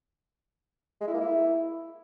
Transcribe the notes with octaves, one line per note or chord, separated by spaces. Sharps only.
G#3
E4
A#3
E4